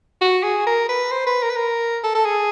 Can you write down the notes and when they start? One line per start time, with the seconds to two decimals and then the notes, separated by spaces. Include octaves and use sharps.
0.21 F#4
0.43 G#4
0.66 A#4
0.89 B4
1.11 C5
1.27 B4
1.43 A#4
1.50 B4
1.56 A#4
2.04 A4
2.15 A4
2.25 G#4